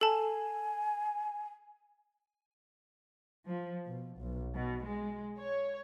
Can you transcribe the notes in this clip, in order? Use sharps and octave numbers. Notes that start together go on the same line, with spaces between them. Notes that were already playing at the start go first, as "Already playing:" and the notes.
A4 G#5 A5
F3
B2
B1
B2
G#3
C#5